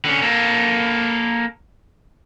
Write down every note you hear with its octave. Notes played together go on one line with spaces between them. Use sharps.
D3 C#4
A#3 A4